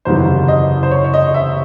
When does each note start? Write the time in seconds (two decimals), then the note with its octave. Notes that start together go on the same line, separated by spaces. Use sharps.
0.05 F#1 E2 C3 D#3 F#3 C5
0.48 D#5
0.83 C5
0.91 C#5
1.04 C#5
1.14 D#5
1.34 E5